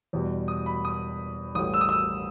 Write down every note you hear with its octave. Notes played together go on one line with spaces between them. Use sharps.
E2 B2 G3
D#6
B5
D#6
A1 A2 G3 D#6
E6
D#6
E6